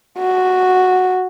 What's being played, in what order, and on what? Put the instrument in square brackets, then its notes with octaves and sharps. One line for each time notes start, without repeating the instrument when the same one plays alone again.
[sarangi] F#4